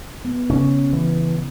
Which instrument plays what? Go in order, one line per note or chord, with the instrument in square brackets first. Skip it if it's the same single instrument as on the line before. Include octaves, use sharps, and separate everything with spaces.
[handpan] B3
[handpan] C#3 [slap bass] C#4
[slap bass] E3